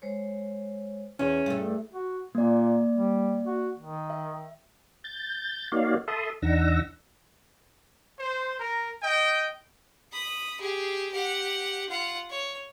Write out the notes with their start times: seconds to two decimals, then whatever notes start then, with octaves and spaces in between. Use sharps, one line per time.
0.02 G#3 C5 C#5
1.19 E2 C#4 G#4 E5
1.46 G2 A3
1.94 F#4
2.35 A#2 A#3 D5
2.96 G3
3.47 F#4
3.79 D#3
4.10 E5
5.04 G6 A6
5.72 A#3 D#4 F#4 C#5 D5 F5
6.08 A4 E5 A5 B5 C6 D#6
6.42 E2 D4 D#4 F#5 E6 A#6
8.19 C5
8.59 A#4
9.02 D#5 G5
10.12 B5 D#6
10.61 G4 G#4
11.12 G4 F#5
11.89 F4 F#5
12.30 C#5